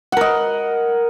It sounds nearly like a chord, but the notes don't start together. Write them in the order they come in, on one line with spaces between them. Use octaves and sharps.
F#5 A#4 D#5